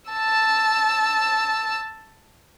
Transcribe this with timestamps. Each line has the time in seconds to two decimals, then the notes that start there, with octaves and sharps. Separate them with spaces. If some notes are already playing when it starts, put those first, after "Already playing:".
0.11 A5 E6